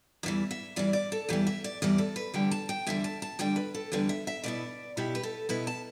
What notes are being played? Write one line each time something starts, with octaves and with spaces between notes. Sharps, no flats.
E2 E3 G3 E5
E5
E2 E3 G3 D5
D5
A4
E2 E3 G3 G4
E5
D5
E2 E3 G3 D5
A4
B4
E2 D3 G3 G5
A5
G5
E2 D3 G3 E5
A5
A5
E2 D3 G3 G5
B4
A4
E2 D3 G3 B4
E5
E5
B2 B3 E4 D5
B2 B3 E4 G4
B4
A4
B2 B3 E4 B4
A5